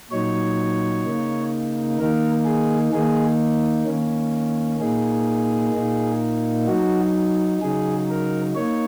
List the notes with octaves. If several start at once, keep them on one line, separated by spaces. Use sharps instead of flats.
A#2 F#3 D#4 C#5
C#3 A#3 D#4
D#3 A#3 D#4 A#4
G#4
D#3 A#3 D#4 G#4
D#3 A#3 C#4
A#2 A#3 D#4 G#4
A#2 A#3 D#4
F#3 D#4 F#4
C#3 F#3 D#4 G#4
A#4
A#3 D#4 C#5